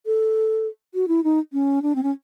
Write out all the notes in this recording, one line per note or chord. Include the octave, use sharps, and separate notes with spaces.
A4
F#4
E4
D#4
C#4
D4
C4
C#4